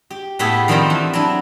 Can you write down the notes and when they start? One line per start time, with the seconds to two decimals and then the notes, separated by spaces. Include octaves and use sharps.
0.10 G4
0.39 A2 B3 G4 G#4 E5
0.68 D#3 F3 G3 B3 C4 D#4
0.90 E3
1.13 F#3 D4 E4